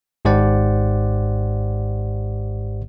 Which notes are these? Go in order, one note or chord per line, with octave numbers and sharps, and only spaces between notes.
G#1 G#2 G4 C5 D5 F#5